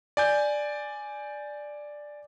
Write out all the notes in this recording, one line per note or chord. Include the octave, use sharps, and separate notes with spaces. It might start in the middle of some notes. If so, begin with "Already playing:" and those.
D5 G#5 G6